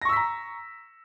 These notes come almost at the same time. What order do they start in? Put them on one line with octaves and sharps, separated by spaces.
A#6 C#6 E6 B6 A#5